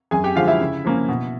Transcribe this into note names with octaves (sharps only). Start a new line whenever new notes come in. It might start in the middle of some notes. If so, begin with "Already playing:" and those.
F#2 G#4 G#5
G4 G5
D3 F3 G#3 F4 F5
E4 E5
C#3
F3 A#3 C#4
B2